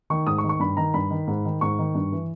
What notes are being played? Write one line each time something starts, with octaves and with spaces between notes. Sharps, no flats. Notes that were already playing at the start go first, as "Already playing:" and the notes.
D#3 C#6
G#2 D#6
C#6
D#3
C#6
G2 B5
D#3 A#5
G2 B5
D#3
G#2
D#3
G#2 C#6
D#3
G2
E3